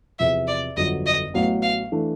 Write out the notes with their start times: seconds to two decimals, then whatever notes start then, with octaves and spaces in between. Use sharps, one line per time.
0.19 E2 C3 F3 E5
0.48 D5
0.77 G1 F2 D3 F#3 D#5
1.06 D#5
1.34 A1 A2 F#3 B3 F5
1.62 F5
1.92 E3 A3 D4